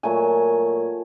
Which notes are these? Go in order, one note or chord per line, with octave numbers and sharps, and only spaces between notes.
A#2 F#3 A3 G#5